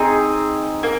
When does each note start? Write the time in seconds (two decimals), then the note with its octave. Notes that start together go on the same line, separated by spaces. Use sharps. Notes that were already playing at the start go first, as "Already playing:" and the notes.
Already playing: C4 D#4 G#4
0.83 A#3